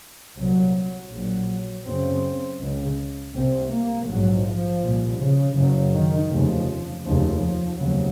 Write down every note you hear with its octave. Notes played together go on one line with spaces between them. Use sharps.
C2 A#2 F#3
A#1 A#2 F#3
F#1 F#2 C#3 C4
C#2 C#3
C2 C3 C4
A#3
A#1 G#2 F#3
F3
C2 A#2
C#3
F#1 F#2 C#3
D#3
F1 D#2 C#3 F3
F1 D#2 C#3 F3
F3
F1 D#2 C#3 F#3